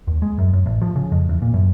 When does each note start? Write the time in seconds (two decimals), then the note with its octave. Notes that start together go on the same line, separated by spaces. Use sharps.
0.07 D#2
0.22 G#3
0.38 F#2
0.53 F#2
0.66 A1
0.82 F3
0.96 C#3
1.12 F2
1.29 E2
1.42 A#2
1.54 F#2